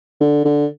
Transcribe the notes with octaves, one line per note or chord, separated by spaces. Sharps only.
D3
D3